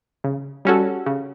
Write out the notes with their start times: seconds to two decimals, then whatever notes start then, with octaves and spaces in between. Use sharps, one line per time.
0.24 C#3
0.65 G3 C#4 F#4 A4
1.06 C#3